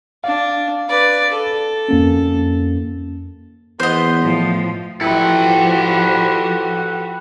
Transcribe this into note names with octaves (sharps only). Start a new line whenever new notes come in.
D4 F5
B4 D5
A4
F2 A#3 C#4
E2 B3 C5 D#5
A2 F3
F3 E4 F#4 G4 A4 B4